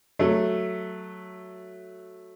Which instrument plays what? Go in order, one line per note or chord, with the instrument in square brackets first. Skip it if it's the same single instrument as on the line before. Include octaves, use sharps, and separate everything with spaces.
[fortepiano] F#3 A3